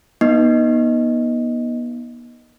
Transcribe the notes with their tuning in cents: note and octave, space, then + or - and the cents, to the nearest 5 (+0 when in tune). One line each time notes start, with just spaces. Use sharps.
B3 -40 D#4 +0 D#5 +0